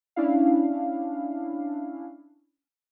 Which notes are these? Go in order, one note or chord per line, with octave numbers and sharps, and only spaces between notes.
C#4 D4 E4 F5